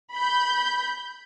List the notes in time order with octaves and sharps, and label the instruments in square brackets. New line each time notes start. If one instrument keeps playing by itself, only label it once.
[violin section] B5 G6